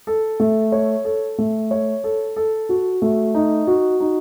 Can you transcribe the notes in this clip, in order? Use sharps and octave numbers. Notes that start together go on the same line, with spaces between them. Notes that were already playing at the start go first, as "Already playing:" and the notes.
A4
A3
C#5
A4
A3
C#5
A4
A4
F#4
A3
D#4
F#4
D#4